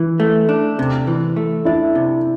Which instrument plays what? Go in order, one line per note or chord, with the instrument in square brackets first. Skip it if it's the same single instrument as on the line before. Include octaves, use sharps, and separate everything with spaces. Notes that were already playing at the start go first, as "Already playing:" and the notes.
Already playing: [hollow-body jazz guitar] E3
A3
D4
C3
E3
A3
[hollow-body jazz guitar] D4 [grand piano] E4
[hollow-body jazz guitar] C3